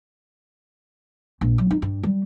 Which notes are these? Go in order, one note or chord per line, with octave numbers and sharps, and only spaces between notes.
A#1
F#3
D#4
G2
G3